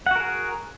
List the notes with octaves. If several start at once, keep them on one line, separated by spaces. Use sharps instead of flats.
F#4 G#4 A#4 F#5